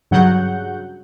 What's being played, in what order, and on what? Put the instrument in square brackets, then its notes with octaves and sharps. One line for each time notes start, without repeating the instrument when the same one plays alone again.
[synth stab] G2 C#3 F#3 F#5 G6